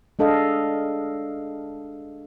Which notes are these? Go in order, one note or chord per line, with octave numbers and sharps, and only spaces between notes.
G#3 D4 A4 D#5 F5